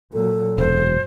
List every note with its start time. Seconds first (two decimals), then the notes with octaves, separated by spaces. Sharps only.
0.13 A#2 F#3 A4
0.58 E1 F#2 C5